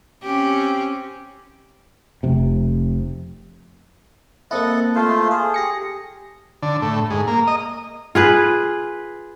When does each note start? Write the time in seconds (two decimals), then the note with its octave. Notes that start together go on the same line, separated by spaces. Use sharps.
0.23 C4 C#4 G4
2.23 F1 C3
4.51 A#3 C4 E4 A4 D#5 F#5
4.95 A3 F4 C5
5.31 G#4 A4
5.54 G4 A#6 C#7
6.63 D3
6.82 A2
7.11 G#2
7.27 A#3
7.47 D#5
8.15 F4 G#4 B4